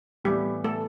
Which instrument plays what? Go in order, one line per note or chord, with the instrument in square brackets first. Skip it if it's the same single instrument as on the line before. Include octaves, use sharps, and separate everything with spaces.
[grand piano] A2 E3 B3 [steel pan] G3 G4
[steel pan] A3 A4